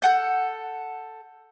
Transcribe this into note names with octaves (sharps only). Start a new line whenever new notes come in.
A4 F#5 G6